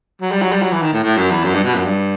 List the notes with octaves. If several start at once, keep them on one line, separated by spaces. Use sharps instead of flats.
F#3
G3
F#3
G3
F#3
E3
D#3
A2
A2
F#2
E2
F#2
G2
B2
F#2
G2